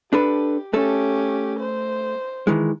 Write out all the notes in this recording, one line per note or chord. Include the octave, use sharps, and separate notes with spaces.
D4 G4 A4 B4
A3 C#4 G4 A4
C5
D#3 E3 G#3